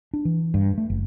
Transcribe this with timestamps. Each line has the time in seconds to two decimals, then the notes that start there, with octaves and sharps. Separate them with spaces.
0.14 D4
0.25 E3
0.54 G2
0.78 A3
0.90 F#1